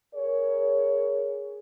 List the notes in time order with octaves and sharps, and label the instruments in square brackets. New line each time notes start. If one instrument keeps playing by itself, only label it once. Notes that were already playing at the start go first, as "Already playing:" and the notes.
[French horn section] G#4 A#4 C#5